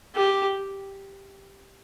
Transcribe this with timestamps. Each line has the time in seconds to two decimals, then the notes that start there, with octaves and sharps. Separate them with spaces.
0.16 G4